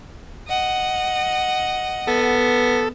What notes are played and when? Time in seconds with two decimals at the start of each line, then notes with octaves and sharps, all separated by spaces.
0.48 D#5 F#5
2.07 B3 A4